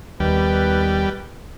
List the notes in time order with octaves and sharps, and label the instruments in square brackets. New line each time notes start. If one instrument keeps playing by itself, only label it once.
[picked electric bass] D#2 [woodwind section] D#3 B3 B4 [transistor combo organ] G3